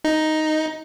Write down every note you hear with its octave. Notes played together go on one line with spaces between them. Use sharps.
D#4